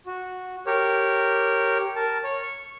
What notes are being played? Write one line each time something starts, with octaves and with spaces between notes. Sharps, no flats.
F#4
G4 A#4 C#5
A#4 A5
C#5
C#6